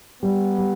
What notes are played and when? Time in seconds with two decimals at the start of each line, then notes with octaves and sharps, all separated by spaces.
0.22 G3 B3
0.58 G3